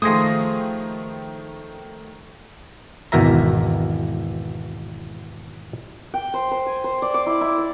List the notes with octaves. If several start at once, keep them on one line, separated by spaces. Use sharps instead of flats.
D#3 F3 A3 G#4 C5 D#6 A#6
G#1 E2 B2 A#4 E5 A#5
G5
C5
C5
G#5
C5
D5
D6
E4
E4
D5